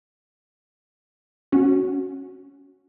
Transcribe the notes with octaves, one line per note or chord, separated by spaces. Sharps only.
C#4 F#4